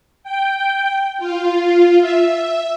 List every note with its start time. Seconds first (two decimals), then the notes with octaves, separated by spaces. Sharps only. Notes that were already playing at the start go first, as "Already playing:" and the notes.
0.23 G5
1.18 F4
2.00 E5